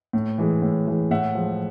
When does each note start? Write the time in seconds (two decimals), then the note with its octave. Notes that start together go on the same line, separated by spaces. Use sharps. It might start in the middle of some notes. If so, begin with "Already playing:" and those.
0.13 A2
0.38 E3 G#3
0.62 A2
0.87 E3 G#3
1.11 A2 E5 F#5
1.35 F3 G#3